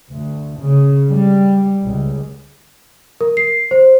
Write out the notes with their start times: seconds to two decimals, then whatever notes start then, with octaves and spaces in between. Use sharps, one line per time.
0.12 D2
0.60 C#3
1.12 G3
1.84 C#2
3.21 A#4
3.37 C7
3.71 C5